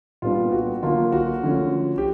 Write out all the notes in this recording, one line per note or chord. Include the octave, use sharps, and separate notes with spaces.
A#2 G3 B3 D4 F4
F#4
D3 F#3 A#3 D4 F4
F#4
D3 F3 A3 C#4
G4